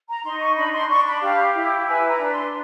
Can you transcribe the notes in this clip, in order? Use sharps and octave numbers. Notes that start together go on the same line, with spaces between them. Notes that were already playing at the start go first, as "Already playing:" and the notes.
A#5
D#4 C6
C#6
D4 B5
C6
D4 C#6
B5
G4 F5
E4
B4 G#5
A#5
D4
C6